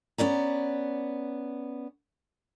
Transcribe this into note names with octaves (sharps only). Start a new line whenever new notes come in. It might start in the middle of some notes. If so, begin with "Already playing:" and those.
B3 C#4 D5 A#5